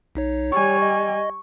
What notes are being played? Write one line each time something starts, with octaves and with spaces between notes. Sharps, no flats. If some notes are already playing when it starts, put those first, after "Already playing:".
B1 D#4 C#5
G3 C#5 G#5 C#6
D#5